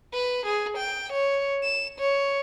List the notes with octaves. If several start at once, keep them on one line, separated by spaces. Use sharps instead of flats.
B4
G#4
G5
C#5
E7
C#5